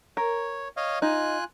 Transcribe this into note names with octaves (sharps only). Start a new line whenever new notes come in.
A#4 C#5
C#5 D#5 F5
D#4 F4 G#5 F#6